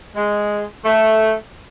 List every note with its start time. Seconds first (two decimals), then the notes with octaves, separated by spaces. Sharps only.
0.16 G#3
0.85 A3